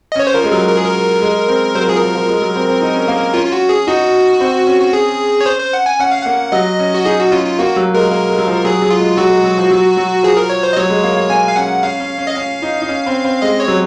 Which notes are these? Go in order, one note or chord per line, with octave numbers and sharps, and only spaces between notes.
D#5
C#4 C#5
C5
F3 A#4
G#3
F#3 A#4
A#4
G#4
A#4
G#3
C4
F#3 C5
A#4
F3 G#4
A#4
F3
F3
G#3
F#3
C4
C4
D#4
C#4
A#3
C#4 F4
F4
F#4
G#4
D#4 F#4
C4
C#4
F#4
G#4
C#5
C5
C5
F#5
G#5
C#4 F#5
F5
A#3 F#5
F#3 D#5
C#4
F#4
D#4 G#4
F#4
C#4 F4
F4
A#3 F#4
F#3
G#3 A#4
A#3 A#4
G#3
F#3
F3
F#3 G#4
F#3
F4
G#3
F#3 F#4
G#3
F#3
F3
F#3
F#3
F3 G#4
A#4
C#5
C5
D#5
F#3 C#5
G#3
A#3
A#3
A#3 G#5
F5
C#4 F#5
C#4 F5
C#4
C#4
D#5
C#4 F5
D#4
D#4
C#4
C4
C4
G#3 D#5
C#5
F#3